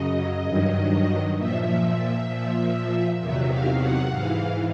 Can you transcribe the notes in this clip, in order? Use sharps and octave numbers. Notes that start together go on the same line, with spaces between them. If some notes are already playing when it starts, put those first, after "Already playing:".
Already playing: F#2 C#3 F#3 D#5
G2 D#3 F#3
A#2 F3 E5
A#2 F3
E2 C3 D#3 F#3 E5
F5
F#5
G#2 E3 F5